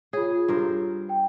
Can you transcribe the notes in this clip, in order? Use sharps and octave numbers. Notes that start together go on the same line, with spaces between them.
F4 G#4 C#5
G2 A#4 C5
G5